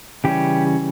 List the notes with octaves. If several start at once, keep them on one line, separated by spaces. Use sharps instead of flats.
C#3 E3 G3 C#4 G4